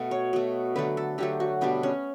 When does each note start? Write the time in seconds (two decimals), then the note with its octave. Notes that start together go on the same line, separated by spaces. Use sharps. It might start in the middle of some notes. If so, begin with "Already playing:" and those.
Already playing: B2 A3 B3
0.11 C#5
0.33 B2 A3
0.76 D3 F#3 A3 B4
0.97 A4
1.18 D3 F#3 A3 G4
1.40 F#4
1.61 B2 G3 B3 D4
1.83 C#4